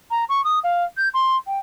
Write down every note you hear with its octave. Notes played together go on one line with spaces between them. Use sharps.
A#5
C#6
D#6
F5
G6
C6
G5